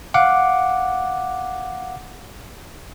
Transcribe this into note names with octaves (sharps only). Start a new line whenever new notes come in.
F5 F#5 D6